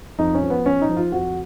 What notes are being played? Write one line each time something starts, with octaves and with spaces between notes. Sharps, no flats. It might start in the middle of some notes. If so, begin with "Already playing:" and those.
F2 D#4
C#4
F3
B3
F3 C#4
D#4
F3
F4
F2 F#4